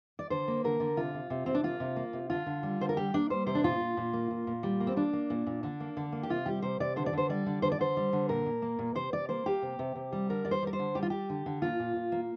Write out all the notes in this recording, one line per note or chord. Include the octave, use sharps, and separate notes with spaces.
D5
D3 C5
A#3
D3 A#4
D3
C3 F4
C3
C3
C3 C4
D4
A#3 F4
C3
A#3
C3
D3 F4
D3
G3
D3 C5
A#4
G3 G4
A#3 D4
G3 C5
C3 C5
D4
A#2 F4
A#2
A#2
A#3
A#2
A#2
G3
A#3
C4
A#3 D4
A#3
A#2
A#2
D3 D4
A#3
D3
A#3
G4
C3 F4
G3 G4
C3 C5
C3 D5
D3 C5
D5
D3 C5
G3 D5
D3
D3 C5
D5
D3 C5
G3
D3
A#2 A#4
A#2
A#3
A#2
C3 C5
C3 D5
A#3 C5
A#3 G4
C3
C3
C3
G3
D3 A#4
G3 D5
C5
G3 A#4
C5
D3
G3 G4
F4
G3 G4
D3
D3
A#2 F4
A#2
A#2
A#3